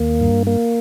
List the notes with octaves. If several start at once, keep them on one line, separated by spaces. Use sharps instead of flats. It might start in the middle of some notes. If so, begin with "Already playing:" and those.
Already playing: D#2 A#3
G2
A#3